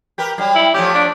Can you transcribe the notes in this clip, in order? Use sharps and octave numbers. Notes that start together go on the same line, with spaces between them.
G4 A#4 B4
F#3 G3
E4
F3 A3 C#4 G4
D4